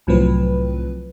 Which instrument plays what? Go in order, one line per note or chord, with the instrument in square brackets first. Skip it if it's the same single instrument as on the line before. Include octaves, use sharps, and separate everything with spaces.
[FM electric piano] C2 A2 F3 F#3 C4 B4